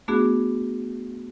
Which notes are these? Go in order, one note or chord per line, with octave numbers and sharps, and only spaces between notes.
A3 B3 D4 F#4 G#4